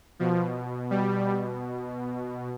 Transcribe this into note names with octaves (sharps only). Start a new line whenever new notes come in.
B2 F3
G3